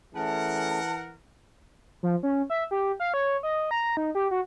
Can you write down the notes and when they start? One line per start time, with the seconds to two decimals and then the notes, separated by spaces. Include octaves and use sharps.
0.14 E3 A3 C#4 G#4 A#4 F#5 A5
2.03 F3
2.23 C#4
2.50 E5
2.71 G4
3.00 F5
3.14 C#5
3.43 D#5
3.71 A#5
3.97 D#4
4.15 G4
4.31 F#4